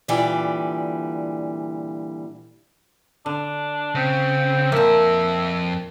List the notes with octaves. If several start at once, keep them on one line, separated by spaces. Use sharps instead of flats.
A#2 D3 E3 G3 D5
D3 D4
C#3 C4
F2 A#2 A#3 E5 A5